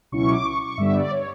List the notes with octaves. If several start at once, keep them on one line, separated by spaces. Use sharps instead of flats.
C#2 B2 F#3 C#4 E4 C#6
D6
C#6
C#6
G2 D3 G3 B3 E5
D5
C#5